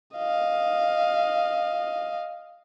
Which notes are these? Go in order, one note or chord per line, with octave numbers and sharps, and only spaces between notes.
D#5 F5